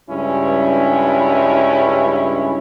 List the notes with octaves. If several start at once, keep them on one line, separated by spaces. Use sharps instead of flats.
C#2 G2 C#4 E4